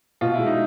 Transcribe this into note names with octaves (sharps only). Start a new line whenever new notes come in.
B2 F4
G#3 E4
D#4